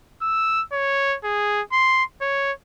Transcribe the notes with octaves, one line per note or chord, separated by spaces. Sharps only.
E6
C#5
G#4
C6
C#5